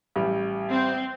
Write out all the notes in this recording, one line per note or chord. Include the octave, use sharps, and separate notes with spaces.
A1 G3
C4